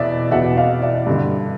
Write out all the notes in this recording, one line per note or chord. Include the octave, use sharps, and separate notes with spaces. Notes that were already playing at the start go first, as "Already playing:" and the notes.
Already playing: E2 B2 D5 E5
E2 B2 E5 F#5
D#5 F5
D5 E5
G2 D3